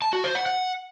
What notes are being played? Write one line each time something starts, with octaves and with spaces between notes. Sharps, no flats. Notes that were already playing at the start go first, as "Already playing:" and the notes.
A5
F#4
C5
F#5
F#5